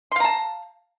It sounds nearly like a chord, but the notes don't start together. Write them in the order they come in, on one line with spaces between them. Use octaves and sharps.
C6 F5 A#5 A5